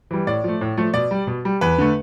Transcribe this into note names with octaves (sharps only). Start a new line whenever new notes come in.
E3 G3
A2 D5
F3 A3
A2
F3 A3
B2 D5
G3
B2
G3
E2 B4
D3 A3